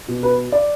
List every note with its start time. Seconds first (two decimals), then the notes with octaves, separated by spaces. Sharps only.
0.08 B2
0.23 B4
0.52 D5